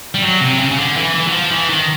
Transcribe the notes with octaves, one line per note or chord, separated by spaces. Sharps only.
G3
F#3
C3
C#3
C#3
D3
E3
E3
F#3
F3
E3
D#3